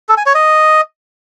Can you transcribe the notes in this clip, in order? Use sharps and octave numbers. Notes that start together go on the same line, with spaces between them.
A4
G#5
C#5
D#5